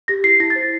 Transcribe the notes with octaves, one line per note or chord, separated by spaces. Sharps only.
G4 A#6
E4 C7
E4 A#6
A6
C5